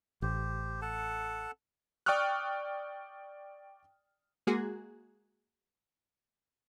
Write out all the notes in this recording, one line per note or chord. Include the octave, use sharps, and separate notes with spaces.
A1 G4 C5
A4 F#5 A5
D5 G5 C#6 D#6 F6 F#6
G#3 A#3 F#4 G#4